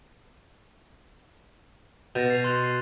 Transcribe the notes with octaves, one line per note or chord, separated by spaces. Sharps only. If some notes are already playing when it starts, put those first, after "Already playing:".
B2 G6 A6 A#6
C7 F7
C6 F#6 A6
C7